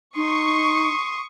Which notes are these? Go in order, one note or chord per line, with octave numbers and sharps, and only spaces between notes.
D#4 C6 C#6 D#6